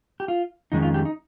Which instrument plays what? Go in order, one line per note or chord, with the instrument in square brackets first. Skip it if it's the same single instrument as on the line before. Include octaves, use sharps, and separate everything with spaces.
[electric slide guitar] G4
F4
F2 D#3 G#3 C#4 D#4
F4
G4
D#4